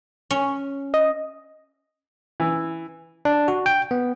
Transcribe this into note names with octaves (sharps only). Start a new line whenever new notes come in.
C#4
D#5
E3
D4
F#4
G5
B3